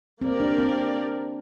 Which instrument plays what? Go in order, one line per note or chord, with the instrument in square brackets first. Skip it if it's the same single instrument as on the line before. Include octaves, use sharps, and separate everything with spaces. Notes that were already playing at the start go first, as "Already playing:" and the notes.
[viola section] A#3 G4 A#4 D5 [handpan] C4
[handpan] D4
C4